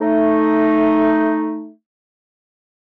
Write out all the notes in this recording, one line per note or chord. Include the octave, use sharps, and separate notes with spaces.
A3 D#4